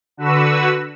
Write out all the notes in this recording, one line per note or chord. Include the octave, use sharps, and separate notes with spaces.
D3 F#4 B4 E6